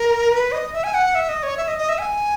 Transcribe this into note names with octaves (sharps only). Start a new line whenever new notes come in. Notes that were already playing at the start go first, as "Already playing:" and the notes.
Already playing: A#4
B4
D#5
E5
G#5
F#5
E5
D#5
C#5
E5
D#5
D#5
E5
G#5